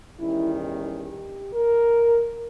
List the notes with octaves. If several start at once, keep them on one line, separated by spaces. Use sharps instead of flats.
E2 D#3 G3 C#4 E4
D#4
G4
A#4